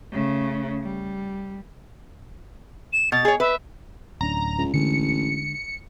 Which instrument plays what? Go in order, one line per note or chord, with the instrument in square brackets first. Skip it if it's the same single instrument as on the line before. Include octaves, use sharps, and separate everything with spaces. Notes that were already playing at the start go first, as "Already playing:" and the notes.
[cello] C#3 A3
G3
[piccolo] E7
[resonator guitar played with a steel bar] B2 [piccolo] A6
[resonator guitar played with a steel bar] G#4 C#5
[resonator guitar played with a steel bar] B4 [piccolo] E5
[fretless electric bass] D1 C#4 D4 [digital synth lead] A#5
[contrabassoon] C#2
[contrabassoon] A1 [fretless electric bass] D3 G#3 [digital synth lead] C#7